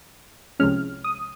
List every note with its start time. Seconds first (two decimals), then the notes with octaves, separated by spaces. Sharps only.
0.60 C2 C3 F3 G#3 C#4 F6
1.04 D#6